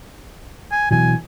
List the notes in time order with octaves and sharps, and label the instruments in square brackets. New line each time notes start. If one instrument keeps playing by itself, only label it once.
[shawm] G#5
[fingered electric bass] B2 E3 F#3 [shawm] G#5